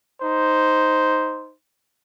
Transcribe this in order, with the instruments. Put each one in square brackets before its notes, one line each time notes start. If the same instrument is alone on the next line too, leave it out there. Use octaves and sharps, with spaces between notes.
[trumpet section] D#4 C5